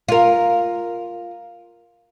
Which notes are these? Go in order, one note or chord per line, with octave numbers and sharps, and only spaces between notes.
F4 A#4